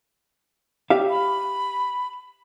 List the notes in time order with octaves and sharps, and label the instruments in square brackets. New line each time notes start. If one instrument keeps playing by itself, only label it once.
[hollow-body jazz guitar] G4 E5 F5
[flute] B5